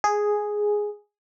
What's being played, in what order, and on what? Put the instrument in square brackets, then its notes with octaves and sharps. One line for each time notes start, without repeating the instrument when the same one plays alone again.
[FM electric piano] G#4